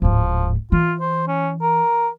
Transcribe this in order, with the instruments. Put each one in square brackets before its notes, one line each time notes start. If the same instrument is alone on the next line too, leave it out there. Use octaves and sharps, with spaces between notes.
[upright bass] D1 G#2 [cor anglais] F3
[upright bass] E3 [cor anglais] F4
[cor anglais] C5
C#4
A#4